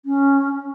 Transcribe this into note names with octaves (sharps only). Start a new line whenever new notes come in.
C#4